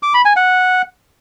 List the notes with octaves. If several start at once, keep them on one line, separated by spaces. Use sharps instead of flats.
D6
B5
G#5
F#5